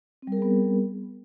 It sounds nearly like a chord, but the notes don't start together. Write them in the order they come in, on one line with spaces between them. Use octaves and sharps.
C4 G3 A#4 G#4 B3